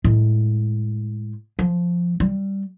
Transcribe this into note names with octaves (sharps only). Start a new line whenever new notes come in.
A2 G#3
F3
G3